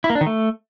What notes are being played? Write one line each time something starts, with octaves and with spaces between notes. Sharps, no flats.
E4
A#3
D4
D#3
A3